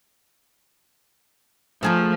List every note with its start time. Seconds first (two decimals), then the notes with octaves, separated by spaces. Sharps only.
1.83 F3 A3 G#4 A#4